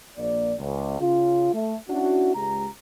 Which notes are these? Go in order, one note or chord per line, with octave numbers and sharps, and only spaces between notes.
A#1 A#3 D5
C#2
C#3 F4
A3
C#4 D4 E4 F#4
C#2 G#3 G4 A#5